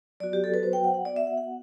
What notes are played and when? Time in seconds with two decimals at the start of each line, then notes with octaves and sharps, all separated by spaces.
0.20 F#3 B3 F#4 D5
0.33 G4
0.44 A4
0.54 B4
0.63 C5
0.73 G5
0.84 F#5
0.94 F#5
1.05 B3 F#4 D5
1.16 E5
1.27 F#5
1.38 F#5